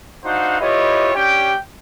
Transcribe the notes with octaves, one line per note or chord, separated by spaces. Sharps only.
D4 D#4 F#4 C5 F5 F#5
E4 F4 G4 B4 C#5 D#5
C#4 D4 G4 G5